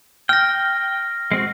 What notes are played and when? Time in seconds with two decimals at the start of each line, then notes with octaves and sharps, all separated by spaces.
0.29 G5 F6 A#6
1.32 G#3 C4 F#4